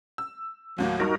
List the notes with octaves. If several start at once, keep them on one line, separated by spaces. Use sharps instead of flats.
E6
D#2 A2 F#3 A#3
G2 D#4 F#4 A#4